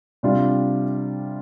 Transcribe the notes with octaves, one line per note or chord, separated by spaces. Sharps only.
C3 G3 D4 F4